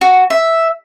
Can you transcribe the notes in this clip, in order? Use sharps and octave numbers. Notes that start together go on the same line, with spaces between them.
F#4
E5